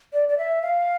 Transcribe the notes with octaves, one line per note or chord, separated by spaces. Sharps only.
D5
D5
E5
F5